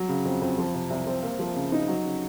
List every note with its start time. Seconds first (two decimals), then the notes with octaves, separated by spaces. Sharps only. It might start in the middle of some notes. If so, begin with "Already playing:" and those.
Already playing: F#3
0.09 C#3
0.25 F2
0.41 F2
0.58 F3
0.74 C3
0.90 C2
1.07 C4
1.23 A#3
1.39 F3
1.56 C#3
1.72 D#4
1.88 F#3
2.04 C#3